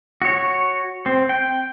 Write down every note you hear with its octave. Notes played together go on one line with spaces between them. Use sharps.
F#4 C#5
C4
G5